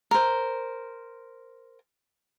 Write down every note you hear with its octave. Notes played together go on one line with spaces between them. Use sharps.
A#4 C5